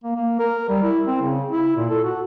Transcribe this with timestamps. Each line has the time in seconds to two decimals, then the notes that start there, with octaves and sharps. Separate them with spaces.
0.04 A#3
0.15 A#3
0.39 A#4
0.69 G3
0.83 E4
1.07 C4
1.22 C#3
1.51 E4
1.76 A#2
1.90 A4
2.04 F#4